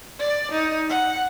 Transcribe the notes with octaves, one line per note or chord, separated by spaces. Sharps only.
D5
D#4
F#5